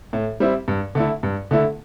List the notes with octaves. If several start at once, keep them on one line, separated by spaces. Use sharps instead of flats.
A2
G3 C4 E4
G2
D3 A3 E4
G2
D3 A3 E4